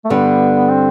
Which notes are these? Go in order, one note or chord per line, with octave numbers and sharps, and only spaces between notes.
A3
G2 D3 G3 B3
C4